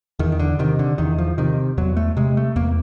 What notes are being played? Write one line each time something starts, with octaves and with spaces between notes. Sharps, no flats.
E2 D#3
D#3
D3
C3 D#3
D3
E2 D#3
F3
C3 D#3
E2 F#3
A3
C3 G#3
A3
E2 A#3